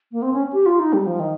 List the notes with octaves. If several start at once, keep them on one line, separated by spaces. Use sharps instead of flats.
A#3
C4
C#4
G4
F4
D#4
G3
F3
D#3